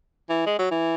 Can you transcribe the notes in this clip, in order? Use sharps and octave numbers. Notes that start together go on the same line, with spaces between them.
E3
G#3
F#3
E3